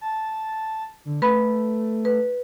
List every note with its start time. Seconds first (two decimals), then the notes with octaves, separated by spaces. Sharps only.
0.01 A5
1.05 D3
1.22 A3 B4 B5
2.05 B4